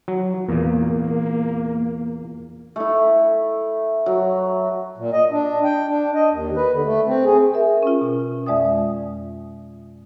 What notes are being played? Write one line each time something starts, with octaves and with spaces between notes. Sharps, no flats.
F#3
E2 A#2 A#3
A3 E4
F#3
A#2
D#5
D4
G5
D4
D#5
D#2
B4
D3
A3
C4
G#4
A#4 E5
C#4 F4
B2
F2 G#3 D5 E5 G5 D#6